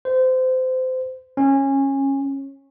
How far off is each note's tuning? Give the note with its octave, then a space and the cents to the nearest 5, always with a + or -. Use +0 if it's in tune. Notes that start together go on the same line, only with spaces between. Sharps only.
C5 -25
C#4 -20